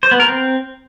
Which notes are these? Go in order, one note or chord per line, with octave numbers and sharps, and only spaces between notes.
C5
B3
A#4
C4